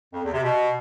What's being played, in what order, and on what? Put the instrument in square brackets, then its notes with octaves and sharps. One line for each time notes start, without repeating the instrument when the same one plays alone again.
[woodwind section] F2
E2
C3
B2